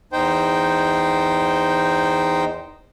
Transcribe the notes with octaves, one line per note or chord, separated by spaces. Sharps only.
E2 D#4 C5 G5